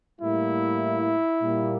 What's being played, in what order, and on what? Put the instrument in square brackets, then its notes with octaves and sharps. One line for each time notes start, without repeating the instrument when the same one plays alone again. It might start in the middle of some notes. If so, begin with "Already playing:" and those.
[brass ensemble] A2 G3 A#3 E4
A#2 G3 A#3